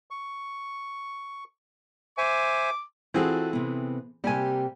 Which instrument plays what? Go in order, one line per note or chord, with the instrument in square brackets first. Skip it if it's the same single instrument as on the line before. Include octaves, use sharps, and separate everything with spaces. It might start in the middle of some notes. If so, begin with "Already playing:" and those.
[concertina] C#6
[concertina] C5 E5 G#5 [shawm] D6
[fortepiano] E3 C4 G#4 [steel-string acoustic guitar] F4 F#4 A4
[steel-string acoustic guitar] C3 B3
[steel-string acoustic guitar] C3 A#3 G4 [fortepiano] G3 G#5